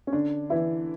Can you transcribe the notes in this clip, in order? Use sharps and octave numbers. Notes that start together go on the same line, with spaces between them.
C#4
D3 D4
E3 E4